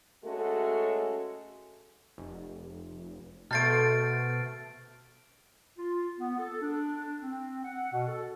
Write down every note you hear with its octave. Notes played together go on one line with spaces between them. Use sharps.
G#3 A3 C#4 F#4 A4
F1
B2 A3 C5 A5 F6 A6 D7
F4
B3
A4
D4
C4
F#5
B2
A4